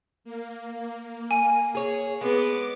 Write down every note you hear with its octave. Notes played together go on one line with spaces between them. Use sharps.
A#3
G#5 D#7
G#4 C#5
G#3 B3 D6